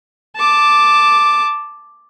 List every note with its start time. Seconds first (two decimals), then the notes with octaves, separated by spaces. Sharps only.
0.36 A5 D6